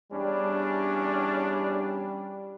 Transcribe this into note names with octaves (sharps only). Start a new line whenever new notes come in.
E2 G3 C#4 D4